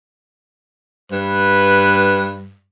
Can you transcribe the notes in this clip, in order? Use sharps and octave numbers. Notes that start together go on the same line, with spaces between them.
G2 B4